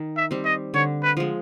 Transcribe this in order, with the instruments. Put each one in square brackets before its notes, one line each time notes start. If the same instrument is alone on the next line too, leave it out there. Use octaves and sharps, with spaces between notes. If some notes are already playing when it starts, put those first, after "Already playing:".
Already playing: [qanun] D#3
[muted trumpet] E5
[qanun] G3 C4
[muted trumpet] D#5
[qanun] D3 [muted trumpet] C#5
[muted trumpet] B4
[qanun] F3 G#3